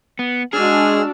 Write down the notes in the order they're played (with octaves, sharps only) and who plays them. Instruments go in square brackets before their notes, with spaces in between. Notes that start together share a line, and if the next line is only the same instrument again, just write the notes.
[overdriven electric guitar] B3
[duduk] G#3 [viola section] D4 F#4 [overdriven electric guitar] G#4 [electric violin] E6 F6